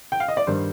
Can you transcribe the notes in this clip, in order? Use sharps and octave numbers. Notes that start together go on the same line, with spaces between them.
G5
F5
D#5
D5
G2 D#3 G3 C5